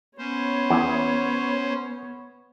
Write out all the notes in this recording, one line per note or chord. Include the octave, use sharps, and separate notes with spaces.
B3 C#4 C5 C#5
E2